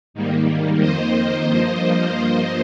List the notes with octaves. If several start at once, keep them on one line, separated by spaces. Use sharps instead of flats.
G#2 D#3 G3 A#3
F2 D#3 A#3 C5 D#5
G2 F3 A#3